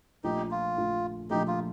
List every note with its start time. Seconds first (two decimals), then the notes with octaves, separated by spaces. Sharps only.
0.24 A#1 A#2 F3 A3 D#4 G4
0.51 F4
0.77 A#1 A#2 F3 A3
1.30 A#1 A#2 F3 A3 D#4 G4
1.47 F4